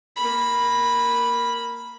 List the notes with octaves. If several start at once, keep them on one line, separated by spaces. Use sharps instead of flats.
A#3 B5